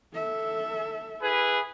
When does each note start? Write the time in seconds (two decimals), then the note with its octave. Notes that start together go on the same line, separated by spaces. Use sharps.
0.13 A4 E5
1.22 E4 G#4 B4